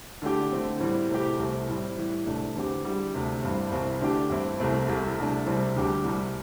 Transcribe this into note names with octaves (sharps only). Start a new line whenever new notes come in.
D3 A3 D4 G4
D3 A3 C4
A2 E3 G3 C4
C3 A3 C4 E4 G4
C2 C3 A3 C4
A2 G3 C4 E4
A2 E3 G3
C2 C3 A3 D4
E2 D3 C4 G4
D3 G3 E4 G4
D2 C3 A3 D4
G2 E3 C4
C2 C3 E3 C4
D3 A3 D4 G4
G2 E3 C4 E4
C2 C3 A3 C4
C2 C3 A3 E4
C2 C3 A3 D4
C2 C3 G3 C4
D2 D3 G3 D4 G4
C2 C3 G3